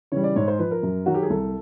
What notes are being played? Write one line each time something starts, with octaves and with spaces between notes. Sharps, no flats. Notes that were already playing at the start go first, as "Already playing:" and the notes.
C#3 E3 G3 C#5
D5
G#2 C#5
C5
F3 B4
A#4
F#2
D#3 F#3 F#4
G4
G#4
C2 A4